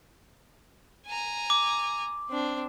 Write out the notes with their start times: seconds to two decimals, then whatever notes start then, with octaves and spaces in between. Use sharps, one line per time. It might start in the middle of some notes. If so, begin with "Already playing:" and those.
1.07 G#5 A#5
1.50 D6
2.30 C4 D4